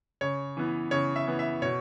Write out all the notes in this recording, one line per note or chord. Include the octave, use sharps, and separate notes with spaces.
C#3 C#5
E3 B3
C#3 C#5
E5
E3 B3
E5
B2 C#5